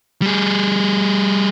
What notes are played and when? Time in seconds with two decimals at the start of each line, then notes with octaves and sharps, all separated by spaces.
0.22 G3 G#4